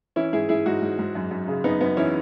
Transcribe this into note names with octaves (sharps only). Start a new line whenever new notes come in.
E3 C#4 E4
G#2 E4 G#4
G#2 E4 G#4
G#2 D#4 F#4
G#2
G#2
F#2
F#2
C#3
F#2 B3 D#4
F#2 B3
E3 C#4 E4